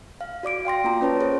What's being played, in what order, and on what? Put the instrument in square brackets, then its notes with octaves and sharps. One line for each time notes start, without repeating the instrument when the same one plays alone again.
[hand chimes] F5
F#4 D5 D6 D7
F5 G5 C6 A#6
A#3 F4 A#5
C#4 B4 C#5 A5
G#4 C5 C#5